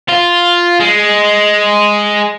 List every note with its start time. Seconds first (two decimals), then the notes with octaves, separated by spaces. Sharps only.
0.09 F4
0.80 G#3